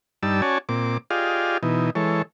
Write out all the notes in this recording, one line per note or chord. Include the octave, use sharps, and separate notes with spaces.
G2 G3 D#4 D5 A5 E6
C#4 F#4 C#5 D5 G#5 A5
A#2 C4 D6
F4 G4 G#4 D5 D#5 F5
B2 E3 D#4
E3 G#3 A4 C#5